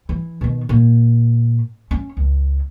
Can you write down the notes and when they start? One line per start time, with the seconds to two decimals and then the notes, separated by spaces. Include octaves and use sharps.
0.09 E3
0.41 B2 D#3
0.69 A#2
1.91 C#4
2.17 C#2